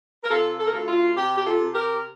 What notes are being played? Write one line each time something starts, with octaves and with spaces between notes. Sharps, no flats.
A#4
C3 F4 A4
A4
A#4
D2 F4 A4
F4
C3 G4
G4
F4 A4
C3
G4 A#4